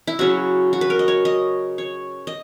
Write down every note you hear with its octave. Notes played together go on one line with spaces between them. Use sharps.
E4
C#3 F#3 C#4 F#4
F#4
B4
A#4
D#5
C#5
D#5
C#5
D#5